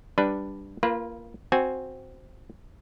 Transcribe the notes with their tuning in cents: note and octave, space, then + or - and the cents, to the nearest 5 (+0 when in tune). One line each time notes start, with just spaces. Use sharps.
G3 +0 D4 +0 B4 +0
A#3 -5 F4 -25 B4 -30
C4 +0 F#4 +0 G#5 +0